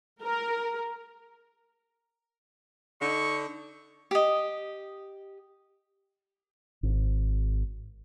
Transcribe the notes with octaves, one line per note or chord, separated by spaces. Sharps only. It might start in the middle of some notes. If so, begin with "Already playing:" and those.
A#4
D3 D#4 C#6
G4 D#5
G#1